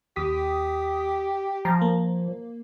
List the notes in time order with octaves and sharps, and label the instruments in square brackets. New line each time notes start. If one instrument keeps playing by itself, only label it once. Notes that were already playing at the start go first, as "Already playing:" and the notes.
[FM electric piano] D#2 D#6 B6 [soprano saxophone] G4
[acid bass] F3 [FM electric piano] A#5
[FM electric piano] A#3